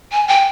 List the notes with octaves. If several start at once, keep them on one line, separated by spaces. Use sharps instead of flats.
G#5
G5